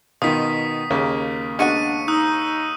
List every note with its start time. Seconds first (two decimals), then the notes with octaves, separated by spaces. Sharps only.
0.22 B2 D#3 F4 D#6 B6
0.90 D#2 C#3 A#3
1.59 G#3 B3 D4 F#4 C#6 C#7 D#7
2.08 D#4 D#6 E6 F#6